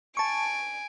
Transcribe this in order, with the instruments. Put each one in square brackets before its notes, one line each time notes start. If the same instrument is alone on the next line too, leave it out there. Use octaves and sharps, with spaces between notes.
[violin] G#5 D7 [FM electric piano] A5 C#6